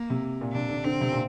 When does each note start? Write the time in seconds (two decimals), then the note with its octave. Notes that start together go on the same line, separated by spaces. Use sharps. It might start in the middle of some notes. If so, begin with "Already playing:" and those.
Already playing: A#3
0.10 C3
0.41 A#2
0.53 C3 D4
0.69 D3
0.84 D3 C4
1.01 C3
1.12 A#2